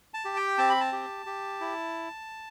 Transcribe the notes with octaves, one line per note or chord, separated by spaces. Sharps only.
A5
G4
G5
C4 A5
B5
A5
G4
G4
E4